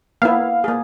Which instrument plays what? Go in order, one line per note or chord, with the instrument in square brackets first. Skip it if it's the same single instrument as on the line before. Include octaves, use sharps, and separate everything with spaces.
[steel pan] A#3 B3 E4 [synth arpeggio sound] F5
[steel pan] A#3 G#4